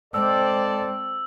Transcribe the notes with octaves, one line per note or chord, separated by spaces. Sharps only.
G#3 C4 A4 D5 E6